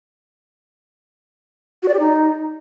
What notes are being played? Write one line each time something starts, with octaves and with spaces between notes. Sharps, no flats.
F#4
D5
G4
D#4